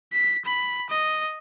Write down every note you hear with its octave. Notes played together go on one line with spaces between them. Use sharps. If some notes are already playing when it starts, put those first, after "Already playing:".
B6
B5
D#5